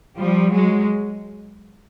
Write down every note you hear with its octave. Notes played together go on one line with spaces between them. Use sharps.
F3 G3
F#3 G#3